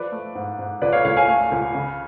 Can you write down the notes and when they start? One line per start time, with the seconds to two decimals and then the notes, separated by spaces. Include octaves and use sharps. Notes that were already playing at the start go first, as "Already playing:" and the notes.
Already playing: F3 B4 D5
0.12 A3
0.35 G#2
0.59 G#2
0.82 C#2 B4 D5
0.93 C#5 F5
1.04 C#2 C#5 F5
1.17 F5 G#5
1.28 A3
1.52 C#2
1.74 C#3